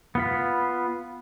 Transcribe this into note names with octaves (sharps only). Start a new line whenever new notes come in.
B3 F4 B5